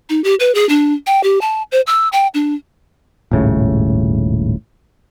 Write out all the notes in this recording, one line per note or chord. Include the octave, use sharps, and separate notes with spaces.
D#4
G4
B4
G#4
D4
G5
G4
A5
C5
E6
G5
D4
D#1 G#1 A2 C#3